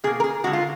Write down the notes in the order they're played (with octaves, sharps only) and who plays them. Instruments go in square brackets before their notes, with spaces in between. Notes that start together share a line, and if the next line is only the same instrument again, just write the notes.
[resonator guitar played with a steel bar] B2 G#4
A#3
A#4
G#4
D3 G#3 F#4
F4